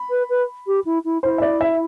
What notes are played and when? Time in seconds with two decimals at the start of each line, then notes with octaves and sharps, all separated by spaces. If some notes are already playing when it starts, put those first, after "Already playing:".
Already playing: B5
0.10 B4
0.29 B4
0.67 G4
0.85 E4
1.05 E4
1.23 E4 C5
1.38 E5
1.42 D5
1.61 E5